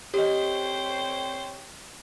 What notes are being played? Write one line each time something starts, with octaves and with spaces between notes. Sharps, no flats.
C4 G4 C5 C#5 D#5 G5